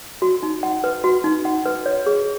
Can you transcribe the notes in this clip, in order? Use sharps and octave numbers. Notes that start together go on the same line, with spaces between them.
F#4
D#4
F#5
B4
F#4
D#4
F#5
B4
C#5
G#4